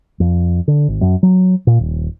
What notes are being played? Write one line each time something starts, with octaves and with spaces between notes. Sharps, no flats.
F2
D3
G#1
F#2
F#3
A#2
D#1